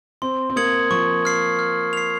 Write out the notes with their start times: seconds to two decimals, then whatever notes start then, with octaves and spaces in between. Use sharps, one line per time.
0.22 C4 C6
0.50 C4
0.56 A#3 D#6 G#6 C#7 F#7
0.90 F3 C#6
1.25 F6 C7
1.59 F6
1.93 C7 F7